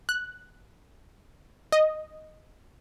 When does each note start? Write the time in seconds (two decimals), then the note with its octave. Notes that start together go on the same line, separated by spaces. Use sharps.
0.09 F#6
1.72 D#5